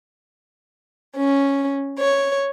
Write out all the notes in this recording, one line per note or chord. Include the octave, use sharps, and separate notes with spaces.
C#4
C#5